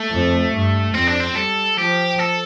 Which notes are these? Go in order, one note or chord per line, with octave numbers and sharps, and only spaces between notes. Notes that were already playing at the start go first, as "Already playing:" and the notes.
Already playing: A3
F2
G2
F2 C4
D4
C4
G3 A4
F3 G4
A4